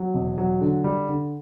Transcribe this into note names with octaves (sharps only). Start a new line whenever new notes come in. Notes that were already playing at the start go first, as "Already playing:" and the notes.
Already playing: F#3
E1
F#3
D3
G3
D3